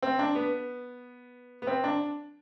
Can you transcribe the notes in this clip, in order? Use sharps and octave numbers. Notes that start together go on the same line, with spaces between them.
C4
D4
B3
B3
C4
D4